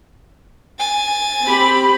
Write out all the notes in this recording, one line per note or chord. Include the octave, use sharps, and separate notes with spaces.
G#5 A6
C4 G4 B5